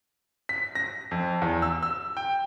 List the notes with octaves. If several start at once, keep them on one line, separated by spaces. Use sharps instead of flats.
B6
A#6
F2
E2
E6
E6
G5